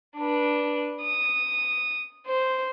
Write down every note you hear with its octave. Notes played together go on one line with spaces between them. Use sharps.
D4 B4
D#6
C5